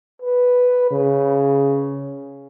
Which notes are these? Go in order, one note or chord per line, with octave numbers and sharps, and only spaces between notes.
B4
C#3